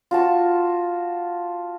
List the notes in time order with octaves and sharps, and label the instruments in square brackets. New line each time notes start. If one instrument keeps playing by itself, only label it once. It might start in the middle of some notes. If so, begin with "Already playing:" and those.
[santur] F4 F#4 A5 C#6